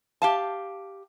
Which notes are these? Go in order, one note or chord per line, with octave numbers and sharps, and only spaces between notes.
G4 F5 A5